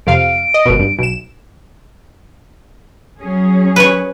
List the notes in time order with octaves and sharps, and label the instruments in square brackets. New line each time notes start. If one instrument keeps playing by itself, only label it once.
[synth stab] F2 C3 F5 [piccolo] D7
[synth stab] D#5
G#1 B2
G2
B1 E7
[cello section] F#3 C#4 G#4
[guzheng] B4 C#5